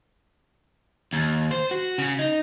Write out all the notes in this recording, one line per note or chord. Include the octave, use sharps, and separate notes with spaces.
D#2
C5
F#4
C#3
D#4